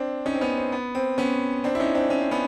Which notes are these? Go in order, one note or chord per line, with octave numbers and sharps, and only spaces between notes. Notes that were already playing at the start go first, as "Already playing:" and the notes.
Already playing: C4 D4
C#4 D#4
C4
B3 C#4
C4
B3
C4
B3 C#4
C4 D4
E4
C#4 D#4
C4 D4
C#4
C4
B3 C#4